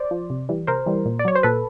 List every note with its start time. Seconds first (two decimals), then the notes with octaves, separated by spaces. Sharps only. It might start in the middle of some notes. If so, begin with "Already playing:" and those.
Already playing: C5 D5
0.11 F3
0.30 C3
0.49 E3 G3
0.67 C3 A#4 C5
0.86 E3 G3
1.06 A#2
1.19 D5
1.25 F#3 C#5
1.35 C5
1.43 A#2 A4 B4